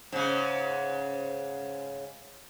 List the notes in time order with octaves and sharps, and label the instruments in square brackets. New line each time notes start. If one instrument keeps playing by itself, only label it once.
[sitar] G#2 C#3